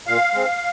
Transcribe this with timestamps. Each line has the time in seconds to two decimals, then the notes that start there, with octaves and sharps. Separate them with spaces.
0.07 A#2 F5
0.34 G#3 C4